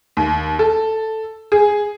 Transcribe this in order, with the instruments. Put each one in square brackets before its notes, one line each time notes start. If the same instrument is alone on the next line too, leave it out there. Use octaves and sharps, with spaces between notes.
[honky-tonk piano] D#2
A4
G#4